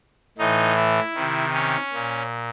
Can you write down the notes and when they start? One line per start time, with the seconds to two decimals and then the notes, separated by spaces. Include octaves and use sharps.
0.38 A2 E3 D#4
0.76 E4
1.15 C3 D#3
1.53 C#4
1.93 A#2